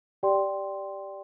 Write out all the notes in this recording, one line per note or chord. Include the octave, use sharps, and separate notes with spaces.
G4 D5 G5 C6